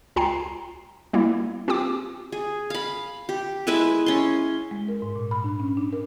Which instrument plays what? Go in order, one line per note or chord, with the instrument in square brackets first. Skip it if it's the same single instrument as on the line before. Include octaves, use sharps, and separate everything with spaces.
[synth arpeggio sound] C#2 F4 G5 G#5 A#5 C7
G3 A#3 B3 E4
C4 F4 G4 G5 D6
[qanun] G#4
F5 B5
G4
G#3 E4 B4 E5
C#4 C6
[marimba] G#3
A#4
G#2
A#2
B5
D4
C#4
D4
A#4